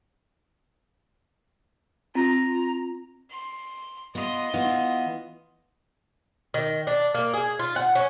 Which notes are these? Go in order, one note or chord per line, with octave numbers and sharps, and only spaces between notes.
C4 F4 A#5
C6
B3 F4 D#5 C6
E3 B3 F4
D#3
D4
A#3
G#4
F4
F#5
C#4